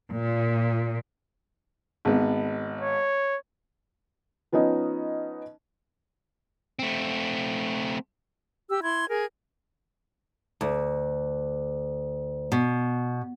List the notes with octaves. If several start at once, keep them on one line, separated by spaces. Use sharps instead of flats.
A#2
G#1 B3
C#5
F3 B3 C#4 D#4 D#5
A3 C4
G4 E6
E4 C6 G#6
G#4 A#4
D2
B2